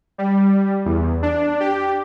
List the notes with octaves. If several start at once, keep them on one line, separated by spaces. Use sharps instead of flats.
G3
E2
D4
G4